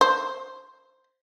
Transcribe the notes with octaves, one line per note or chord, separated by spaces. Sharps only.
C5